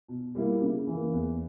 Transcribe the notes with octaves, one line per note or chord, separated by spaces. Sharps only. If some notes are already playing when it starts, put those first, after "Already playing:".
B2
G3 A#3 E4
C#3
E3
A#3
E2